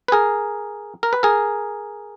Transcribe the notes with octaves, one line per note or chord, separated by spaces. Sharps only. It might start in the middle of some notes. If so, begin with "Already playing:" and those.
B4
G#4 A#4
A#4
B4
G#4 A#4